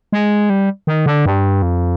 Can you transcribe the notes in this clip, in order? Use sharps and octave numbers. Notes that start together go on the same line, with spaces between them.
G#3
G3
D#3
D3
G2
F2